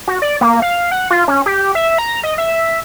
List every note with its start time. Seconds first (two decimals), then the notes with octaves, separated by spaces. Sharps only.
0.08 F#4
0.22 D5
0.41 A#3
0.62 F5
0.91 F#5
1.11 F4
1.28 C#4
1.46 G4
1.75 E5
1.98 A#5
2.24 D#5
2.38 E5